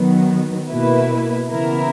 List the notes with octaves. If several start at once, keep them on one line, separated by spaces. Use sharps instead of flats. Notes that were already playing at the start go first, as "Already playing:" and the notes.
Already playing: D#3 F#3 B3
B2 A#3 E4 B4
C#3 E3 B3 E4 A#4